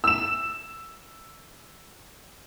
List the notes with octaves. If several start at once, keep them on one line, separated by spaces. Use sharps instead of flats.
E6 E7